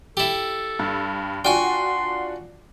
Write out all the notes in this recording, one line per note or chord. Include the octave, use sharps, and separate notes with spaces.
E4 G4 A4
G2
D4 F4 F#4 G5 G#5 C6 C#6